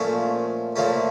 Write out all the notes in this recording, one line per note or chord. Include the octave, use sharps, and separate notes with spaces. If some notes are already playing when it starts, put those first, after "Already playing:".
Already playing: A#2 F3 A3 C#4
A#2 F3 A3 C#4